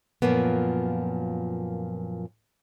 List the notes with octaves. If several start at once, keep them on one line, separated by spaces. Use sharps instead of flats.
F#2 A#2 F3 A#3 B3